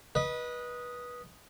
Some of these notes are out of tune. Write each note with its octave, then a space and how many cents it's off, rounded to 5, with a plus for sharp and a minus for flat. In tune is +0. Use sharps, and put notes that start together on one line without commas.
B4 -20 D#5 +0